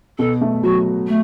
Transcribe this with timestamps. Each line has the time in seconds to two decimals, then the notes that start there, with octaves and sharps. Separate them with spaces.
0.19 B2 A4
0.41 A3
0.63 F#3 F#4
1.07 A3